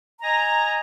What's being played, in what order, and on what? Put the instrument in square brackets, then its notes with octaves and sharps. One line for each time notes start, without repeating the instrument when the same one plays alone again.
[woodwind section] D#5 G#5 A#5